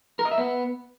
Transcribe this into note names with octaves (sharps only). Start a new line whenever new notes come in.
A#4
D#5
E5
B3